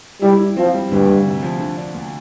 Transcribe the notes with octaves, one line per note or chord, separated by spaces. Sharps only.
G3 E4
E4
F3 C4
G3
D2 G2
D2
C3
F3
D3
D4
D2